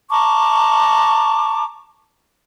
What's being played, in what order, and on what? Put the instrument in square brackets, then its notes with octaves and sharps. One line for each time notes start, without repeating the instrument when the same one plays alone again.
[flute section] A5 A#5 C#6 D6